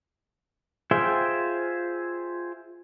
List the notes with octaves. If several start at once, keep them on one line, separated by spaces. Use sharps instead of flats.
F4 G#4 C5 E5 G5